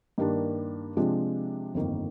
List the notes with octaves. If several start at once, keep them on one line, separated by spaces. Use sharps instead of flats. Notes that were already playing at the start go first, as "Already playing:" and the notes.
G2 D#3 A#3 D4
C3 F3 G#3 D4
G1 F2 D#3 A#3